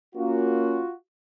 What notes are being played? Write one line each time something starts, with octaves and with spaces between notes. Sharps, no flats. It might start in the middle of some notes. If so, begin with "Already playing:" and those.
A#3 C#4 F4 F#4